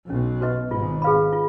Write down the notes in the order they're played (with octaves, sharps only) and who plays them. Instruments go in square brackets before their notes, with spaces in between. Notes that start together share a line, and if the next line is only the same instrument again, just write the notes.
[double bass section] B1 B2 [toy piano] C#4
[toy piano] F#4 B4 D#5
[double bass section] G#1 G#2 [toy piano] F4
[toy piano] G#4 B4 F5 B5
F4